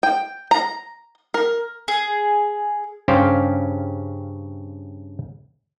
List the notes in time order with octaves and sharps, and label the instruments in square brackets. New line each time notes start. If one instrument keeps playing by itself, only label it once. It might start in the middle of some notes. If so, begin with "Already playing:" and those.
[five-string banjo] G5
A#5
A#4
[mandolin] G#4
[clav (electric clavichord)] G2 C#3 C#4 G4 C5 F5